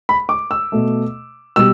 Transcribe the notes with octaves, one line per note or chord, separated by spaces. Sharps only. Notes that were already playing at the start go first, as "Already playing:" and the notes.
B5
D6
E6
B2 A3
B2 G3 E6